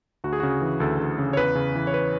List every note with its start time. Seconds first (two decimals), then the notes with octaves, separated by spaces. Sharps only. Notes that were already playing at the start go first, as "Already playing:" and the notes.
0.24 D2 F#4
0.33 G#4
0.40 C#3 F#4
0.62 E3
0.80 D2 A4
1.00 D2
1.18 C#3
1.33 C#5
1.37 E2 B4
1.55 C#3
1.75 E3
1.87 C#5
1.94 B4